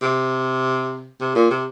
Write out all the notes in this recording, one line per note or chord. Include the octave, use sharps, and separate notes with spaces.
C3
C3
A#2
C3